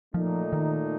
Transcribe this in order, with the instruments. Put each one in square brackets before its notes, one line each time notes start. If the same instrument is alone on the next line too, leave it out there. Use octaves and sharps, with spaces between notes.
[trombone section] A#2 A3 D#4 [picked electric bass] F3
[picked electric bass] D#3